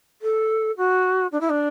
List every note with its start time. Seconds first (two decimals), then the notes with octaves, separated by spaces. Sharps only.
0.21 A4
0.77 F#4
1.32 D4
1.40 E4
1.49 D4